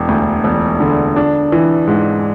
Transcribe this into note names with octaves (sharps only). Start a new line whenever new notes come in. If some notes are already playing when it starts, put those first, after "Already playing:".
Already playing: E1
D2
E1
D3
D4
E3
G#2